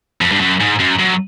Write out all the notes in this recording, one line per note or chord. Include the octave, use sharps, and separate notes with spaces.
F2
G2
F#2
G#2
F#2
F#2